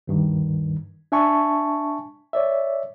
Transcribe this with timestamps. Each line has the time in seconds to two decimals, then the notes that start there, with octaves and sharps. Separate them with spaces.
0.08 D2 G2 D#3
1.12 D4 E5 G#5 A5 C#6
2.33 C#5 D5 E5